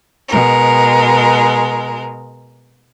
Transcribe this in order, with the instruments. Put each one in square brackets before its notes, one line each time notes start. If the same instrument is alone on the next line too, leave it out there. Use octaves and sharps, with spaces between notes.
[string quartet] B2 G#3 A#4